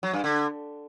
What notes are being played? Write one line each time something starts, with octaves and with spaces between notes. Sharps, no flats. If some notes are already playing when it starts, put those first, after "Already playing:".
F#3
G2
D3